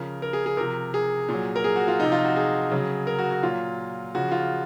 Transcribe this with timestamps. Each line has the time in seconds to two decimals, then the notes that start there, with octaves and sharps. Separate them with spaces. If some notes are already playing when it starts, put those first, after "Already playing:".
Already playing: C#3 F3 A#4
0.22 A#4
0.33 G#4
0.46 G#4
0.57 C3 F3 A#4
0.94 G#4
1.29 A#2 F#3
1.56 A#4
1.64 G#4
1.76 F#4
1.88 F4
2.00 C3 F3 D#4
2.12 F4
2.25 F#4
2.36 G#4
2.71 C#3 F#3
3.07 A#4
3.19 F#4
3.31 F#4
3.43 A#2 F#3 F4
4.15 C#3 F3 F#4
4.32 F4